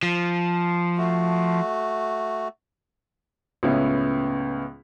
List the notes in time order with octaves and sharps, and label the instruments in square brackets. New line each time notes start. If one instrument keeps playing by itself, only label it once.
[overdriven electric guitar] F3
[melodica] A3 F#4
[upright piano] C#2 A2 B3 C#4 E4